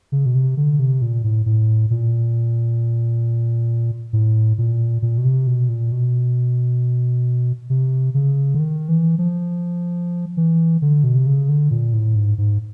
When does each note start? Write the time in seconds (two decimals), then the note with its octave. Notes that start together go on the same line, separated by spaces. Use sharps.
0.12 C#3
0.26 B2
0.35 C3
0.57 D3
0.79 C3
1.02 A#2
1.24 A2
1.46 A2
1.90 A#2
4.13 A2
4.58 A#2
5.02 A#2
5.18 B2
5.25 C3
5.47 B2
5.69 A#2
5.92 B2
7.70 C3
8.14 C#3
8.54 D3
8.59 D#3
8.89 E3
9.18 F3
10.37 E3
10.82 D3
11.04 B2
11.15 C3
11.26 C#3
11.49 D3
11.71 A#2
11.93 A2
12.15 G#2
12.38 G#2